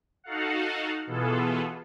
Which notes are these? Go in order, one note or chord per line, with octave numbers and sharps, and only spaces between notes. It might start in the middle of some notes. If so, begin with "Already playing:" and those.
D#4 F#4 A4 F5 F#5
B2 E3 B3 F4 G#4 A4